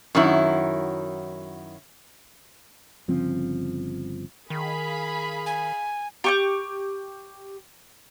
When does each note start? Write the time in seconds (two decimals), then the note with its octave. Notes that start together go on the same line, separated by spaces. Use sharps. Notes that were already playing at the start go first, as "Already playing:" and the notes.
0.15 F#2 D#3 F#3 E4
3.08 G1 C#3 F3 C4
4.50 D#3 G#4 F5 B5
5.46 G#5
6.24 G4 C#6 G6